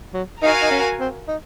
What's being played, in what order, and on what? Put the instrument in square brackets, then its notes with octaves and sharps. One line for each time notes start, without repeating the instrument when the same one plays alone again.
[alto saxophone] F#3
[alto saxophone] D#4 [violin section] F#4 A#4 F5 G#5
[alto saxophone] D#4
C#4
C4
D#4